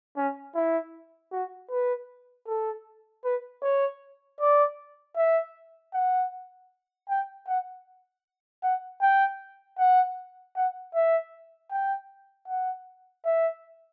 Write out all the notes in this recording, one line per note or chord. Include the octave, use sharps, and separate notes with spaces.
C#4
E4
F#4
B4
A4
B4
C#5
D5
E5
F#5
G5
F#5
F#5
G5
F#5
F#5
E5
G5
F#5
E5